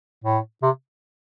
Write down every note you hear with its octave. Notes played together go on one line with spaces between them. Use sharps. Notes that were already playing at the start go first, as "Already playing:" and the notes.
A2
C3